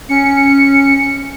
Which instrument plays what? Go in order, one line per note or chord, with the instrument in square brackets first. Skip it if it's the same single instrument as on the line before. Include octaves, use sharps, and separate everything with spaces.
[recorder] C#4 [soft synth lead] C#7